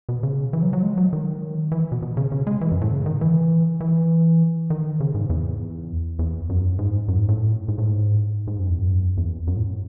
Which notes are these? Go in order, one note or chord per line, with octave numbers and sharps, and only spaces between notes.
B2
C#3
E3
F#3
F#3
G#3
F#3
D#3
E3
B2
B2
C#3
C#3
G#3
E3
F#2
A2
C#3
D#3
E3
E3
D#3
C#3
G#2
E2
E2
F#2
G#2
F#2
G#2
A2
G#2
A2
G#2
G#2
F#2
E2
F#2
E2
F#2
A2